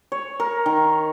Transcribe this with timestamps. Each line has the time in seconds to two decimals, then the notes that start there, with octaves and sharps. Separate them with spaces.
0.12 C#5
0.40 A#4
0.66 D#3